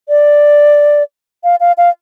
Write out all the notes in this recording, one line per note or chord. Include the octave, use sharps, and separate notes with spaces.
D5
F5
F5
F5